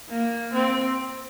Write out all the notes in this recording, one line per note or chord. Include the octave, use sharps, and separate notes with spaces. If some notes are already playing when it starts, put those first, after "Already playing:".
A#3
C4